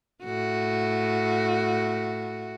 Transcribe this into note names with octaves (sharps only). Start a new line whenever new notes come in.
A2 F#4